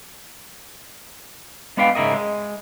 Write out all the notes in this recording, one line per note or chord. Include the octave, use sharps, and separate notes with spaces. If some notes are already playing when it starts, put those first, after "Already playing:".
G#3 B3 D4 B4 F5 G5
G#2 C#3 E4 A#4 D#5
G#3